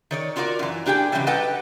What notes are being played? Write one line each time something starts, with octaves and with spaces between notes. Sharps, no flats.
D#3 C#5 D5
D4 F4 F#4 A#4 D5
F#2 E3
A#3 D4 G4 G#4 G5
G#2 C#3 E3 F#3 G3
G4 A4 B4 D#5 F#5 G5